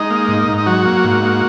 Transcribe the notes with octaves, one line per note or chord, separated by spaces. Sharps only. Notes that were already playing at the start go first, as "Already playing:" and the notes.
Already playing: G#3 D#4 D#5
A#3
G#2
G#2
D#5
F#3 F#4 F#5
A#3
G#2
A#3